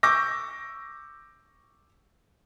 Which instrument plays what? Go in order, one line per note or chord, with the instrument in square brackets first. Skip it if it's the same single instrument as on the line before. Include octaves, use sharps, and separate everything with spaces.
[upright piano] C#6 D6 E6 G6 A#6